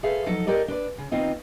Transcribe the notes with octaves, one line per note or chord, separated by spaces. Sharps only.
G#4 A4 B4 C5 E5 F5
F3 F#3 D#4 A4
G4 A4 A#4 D5 D#5
D4 B4 C5 D5
C#3
D#3 B3 C4 D#4 F4 D#5